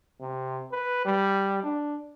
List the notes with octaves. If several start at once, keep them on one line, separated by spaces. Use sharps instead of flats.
C3
B4
G3
D4